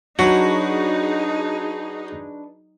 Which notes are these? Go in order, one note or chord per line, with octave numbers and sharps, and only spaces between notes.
F#3 D4 D#4 F#4 G#4 B4 C#5